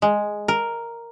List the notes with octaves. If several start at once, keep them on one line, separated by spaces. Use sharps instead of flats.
G#3
A#4